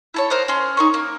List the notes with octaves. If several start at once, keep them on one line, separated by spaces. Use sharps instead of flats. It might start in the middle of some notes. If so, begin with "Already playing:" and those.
E4 A4 C#5
A#4 C5 D#5 F#5
C#4 C6
D#4 A#4 C#6
A#3